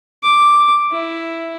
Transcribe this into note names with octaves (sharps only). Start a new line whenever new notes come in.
D6
E4